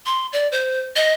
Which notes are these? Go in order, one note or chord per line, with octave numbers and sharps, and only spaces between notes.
C6
D5
C5
D#5